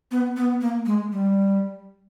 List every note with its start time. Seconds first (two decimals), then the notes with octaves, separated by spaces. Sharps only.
0.11 B3
0.37 B3
0.61 A#3
0.86 G#3
1.12 G3